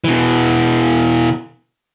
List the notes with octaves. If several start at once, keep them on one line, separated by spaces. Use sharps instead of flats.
B2 E3